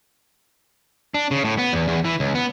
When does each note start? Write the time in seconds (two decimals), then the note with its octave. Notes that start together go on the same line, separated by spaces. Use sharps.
1.14 D4
1.31 C#3
1.45 A2
1.58 B3
1.73 E2
1.88 E2
2.05 E3
2.20 C#2
2.35 B3